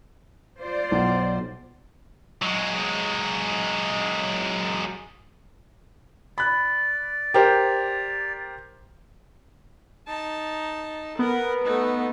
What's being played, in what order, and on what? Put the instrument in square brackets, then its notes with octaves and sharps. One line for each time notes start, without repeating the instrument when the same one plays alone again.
[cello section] F4 C5 D5
[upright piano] B1
[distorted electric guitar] F#3 G#3
[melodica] D5 [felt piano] B5 F#6
[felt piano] G4 A#4 C5
[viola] D#4 A5
[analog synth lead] B3 [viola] A#4
[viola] A3 D#4